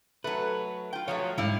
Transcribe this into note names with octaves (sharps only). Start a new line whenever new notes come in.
F#3 A3 B4
F4 G5
F3 F#3 A3 C#5 F5
C#2 G#2 G3 E4 F5